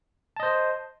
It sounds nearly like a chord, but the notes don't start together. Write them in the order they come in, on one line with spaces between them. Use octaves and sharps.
A5 D#5 C5